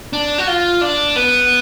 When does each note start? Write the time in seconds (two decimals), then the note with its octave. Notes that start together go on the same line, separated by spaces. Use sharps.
0.13 D4
0.38 F#4
0.47 F4
0.81 D4
1.16 B3